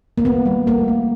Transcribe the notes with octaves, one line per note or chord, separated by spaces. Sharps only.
A#3
D#3 B3
G3
A3 A#3
A3